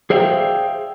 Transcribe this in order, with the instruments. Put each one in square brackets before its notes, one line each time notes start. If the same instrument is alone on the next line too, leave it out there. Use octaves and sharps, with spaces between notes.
[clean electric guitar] G#4 C5 D5 E5 F5 G5